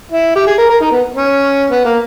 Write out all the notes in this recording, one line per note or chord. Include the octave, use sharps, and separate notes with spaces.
E4
G4
G#4
A#4
A#4
D#4
B3
C#4
B3
A#3